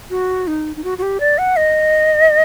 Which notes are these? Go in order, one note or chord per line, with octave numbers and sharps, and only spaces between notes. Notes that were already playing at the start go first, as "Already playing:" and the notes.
F#4
D#4
D#4
F#4
F#4
G4
D5
F#5
D#5